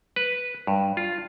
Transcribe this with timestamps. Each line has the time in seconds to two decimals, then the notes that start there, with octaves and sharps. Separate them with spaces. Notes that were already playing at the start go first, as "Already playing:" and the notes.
0.16 B4
0.67 G2
0.97 F4